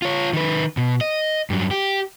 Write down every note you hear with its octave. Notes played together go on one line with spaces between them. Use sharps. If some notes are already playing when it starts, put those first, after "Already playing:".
F4 C#5
D#3 B4
B2
D#5
G2 F#3
G4